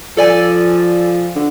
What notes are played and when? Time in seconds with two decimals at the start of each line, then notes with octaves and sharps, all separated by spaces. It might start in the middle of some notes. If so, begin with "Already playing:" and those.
0.17 F3 A4 D5 G#5
1.36 D3